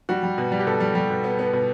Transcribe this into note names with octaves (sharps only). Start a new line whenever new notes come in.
G3 F#4
G3
B2
G3
G4
B2 A4
G3
G3
B2
B3
B3
B2